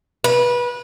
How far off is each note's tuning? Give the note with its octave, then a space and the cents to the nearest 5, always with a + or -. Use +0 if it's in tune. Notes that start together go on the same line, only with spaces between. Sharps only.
B4 -25